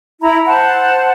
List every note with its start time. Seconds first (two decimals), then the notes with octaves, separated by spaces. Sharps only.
0.22 E4 A#5 B5
0.47 C5 F#5 A5